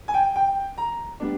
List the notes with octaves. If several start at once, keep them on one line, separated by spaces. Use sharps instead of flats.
G#5
G5
G5
A#5
G3 B3 D4